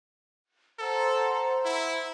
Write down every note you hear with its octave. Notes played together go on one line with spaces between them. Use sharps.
A4 C5 F#5 A#5
E4